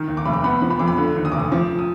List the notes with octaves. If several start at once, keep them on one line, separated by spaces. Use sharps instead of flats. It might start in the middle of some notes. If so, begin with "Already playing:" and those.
Already playing: D#3 F6
D#2
D6
F1 B5
D6
B3 B5
F3
B5
F2 D6
B5
D3
D#2
D#6
F1 D6
D#6
F3 D6
D#6